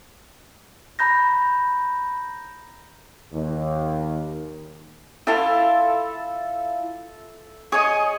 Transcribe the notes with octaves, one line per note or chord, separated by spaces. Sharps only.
A#5 B5 G6 A#6
D#2
E4 F4 A4 E5 A5
G#4 C#5 D#5